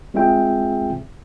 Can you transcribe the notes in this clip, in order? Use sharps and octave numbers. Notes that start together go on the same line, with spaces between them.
G#3 C4 F4 G#4 E5 G5